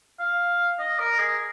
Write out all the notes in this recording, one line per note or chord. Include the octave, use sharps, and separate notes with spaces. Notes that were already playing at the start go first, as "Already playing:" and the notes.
F5
D#5
A#4
G#4